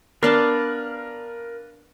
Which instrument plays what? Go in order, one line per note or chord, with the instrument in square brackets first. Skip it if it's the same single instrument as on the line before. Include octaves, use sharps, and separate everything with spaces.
[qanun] B3 D4 A5 [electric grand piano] A#4 [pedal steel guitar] B4 D5 F5